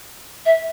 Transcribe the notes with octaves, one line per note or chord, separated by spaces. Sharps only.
E5